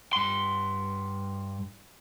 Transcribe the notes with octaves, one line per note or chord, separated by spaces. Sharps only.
G2 C6